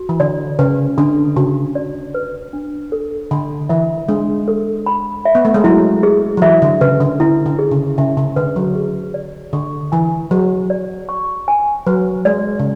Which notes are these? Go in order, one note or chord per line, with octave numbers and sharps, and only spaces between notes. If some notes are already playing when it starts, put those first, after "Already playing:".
Already playing: F#4
E3
D3 D5
C#3 B4
D3 D4
C#3 F#4
D5
B4
D4
A4
D3 B5
E3 E5
G#3 D4
A4
B5
E5
B3
A3
G#3
F#3 E4
G#4
F#3
E3 E5
D3
C#3 B4
D3
D3 E4
D3
G#4
C#3
C#3 E5
C#3
D3 B4
F#3
G#4
D5
D3 C#6
E3 G#5
F#3 G#4
D5
C#6
G#5
F#3 B4
G#3 D5
C#3